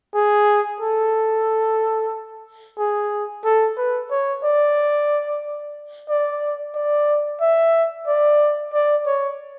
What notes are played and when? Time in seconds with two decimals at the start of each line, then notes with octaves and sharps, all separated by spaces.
0.15 G#4
0.81 A4
2.79 G#4
3.45 A4
3.77 B4
4.11 C#5
4.44 D5
6.09 D5
6.75 D5
7.41 E5
8.07 D5
8.73 D5
9.07 C#5